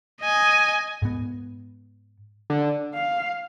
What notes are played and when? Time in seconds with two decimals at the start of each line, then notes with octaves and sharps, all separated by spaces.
0.22 D#5 G#5
1.02 G#2 B3
2.50 D3
2.94 F5